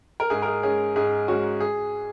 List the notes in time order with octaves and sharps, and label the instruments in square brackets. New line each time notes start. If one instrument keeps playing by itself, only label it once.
[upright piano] A#4
G#2 G#4
A#4
G#4
G#3 C#4 G#4
G#2 G#4
G#3 C#4 F#4
G#4